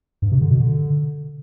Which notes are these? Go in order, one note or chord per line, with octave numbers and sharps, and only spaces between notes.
G2
C3
D3
B2
D3